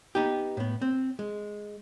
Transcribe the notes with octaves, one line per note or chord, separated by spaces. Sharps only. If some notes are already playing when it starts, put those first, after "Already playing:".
B3 D#4 G4
A2 B3
C4
G#3